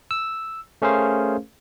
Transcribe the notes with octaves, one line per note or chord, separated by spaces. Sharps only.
E6
A3 C#4 G#4 A#4 C5 F5